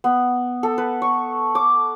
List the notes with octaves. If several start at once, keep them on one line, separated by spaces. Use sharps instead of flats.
B3
A4
B4
C#6
D6